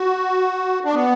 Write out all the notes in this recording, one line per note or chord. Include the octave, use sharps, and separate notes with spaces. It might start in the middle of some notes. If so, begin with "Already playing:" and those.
Already playing: F#4
D4
B3